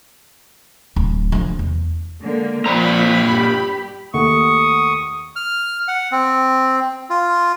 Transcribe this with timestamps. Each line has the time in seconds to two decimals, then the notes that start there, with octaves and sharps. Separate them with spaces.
0.96 D1
1.32 D3 F3
1.59 E2
2.21 D3 G#3 A#3
2.66 A#2 F3 C4 A#5 B5
3.28 G2 G4
4.14 D#2 A3 F#5 C#6 D#6
5.36 F6
5.88 F#5
6.12 C4
7.10 F4